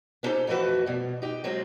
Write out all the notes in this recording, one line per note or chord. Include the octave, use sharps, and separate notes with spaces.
B3 C#4 D#4 G4 A4 C5
F2 E3 F3 A3 F#4 B4
B2 G3
D#4 G4
F#3 G#3 C4 F4